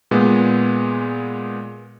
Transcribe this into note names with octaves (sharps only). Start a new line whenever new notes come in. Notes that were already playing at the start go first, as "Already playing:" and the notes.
A#2 G#3 B3